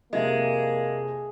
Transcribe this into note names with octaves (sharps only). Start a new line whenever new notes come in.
F2 C3 G#3 A#3 D#5 E5